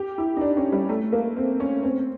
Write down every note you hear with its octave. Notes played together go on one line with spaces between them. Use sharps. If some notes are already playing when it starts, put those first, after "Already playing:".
Already playing: G4
E4
D#4
D4
C#4
G3
A3
A#3
C4
C#4
C4